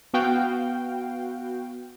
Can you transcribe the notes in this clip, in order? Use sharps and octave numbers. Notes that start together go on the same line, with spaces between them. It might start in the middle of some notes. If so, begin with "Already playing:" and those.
B3 F#4 F5 G5